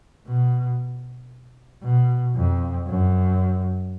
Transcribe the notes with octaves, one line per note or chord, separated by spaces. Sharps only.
B2
B2
F2
F#2